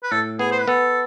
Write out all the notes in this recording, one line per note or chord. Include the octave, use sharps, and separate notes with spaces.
B4
A2 A4
B3 G#4
C5
B4
B3 A4